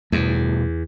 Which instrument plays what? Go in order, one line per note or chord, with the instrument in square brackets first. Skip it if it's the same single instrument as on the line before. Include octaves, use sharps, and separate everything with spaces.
[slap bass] E2 [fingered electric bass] B2 G3 A3